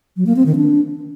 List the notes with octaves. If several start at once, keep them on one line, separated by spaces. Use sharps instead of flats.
F#3
A#3
C4
D#3
D4